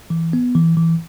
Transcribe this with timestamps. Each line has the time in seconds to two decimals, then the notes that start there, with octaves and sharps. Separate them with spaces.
0.10 E3
0.33 B3
0.55 E3
0.77 E3